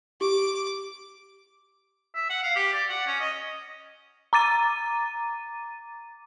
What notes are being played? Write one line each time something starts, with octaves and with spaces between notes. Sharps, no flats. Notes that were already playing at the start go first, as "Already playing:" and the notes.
G4 D6
E5
F#5
F5
G4
D5
F#5
C#4
D#5
A#5 D6 A6 D#7